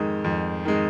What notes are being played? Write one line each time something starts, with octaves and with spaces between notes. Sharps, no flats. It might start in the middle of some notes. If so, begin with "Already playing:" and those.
Already playing: F2 D#3 G#3
F2
D#3 G#3